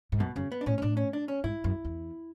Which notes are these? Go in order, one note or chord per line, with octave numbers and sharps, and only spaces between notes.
G#2
F#2 B2
F#2 C#3
B3
D4
A2 C#4
C#4
A2 D4
C#4
D4
C#4
G#2 E4
F#2
E2